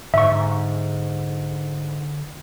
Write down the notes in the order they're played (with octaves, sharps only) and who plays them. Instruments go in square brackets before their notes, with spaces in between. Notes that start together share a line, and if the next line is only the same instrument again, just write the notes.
[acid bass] G#2 [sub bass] D3 [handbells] E5 C#6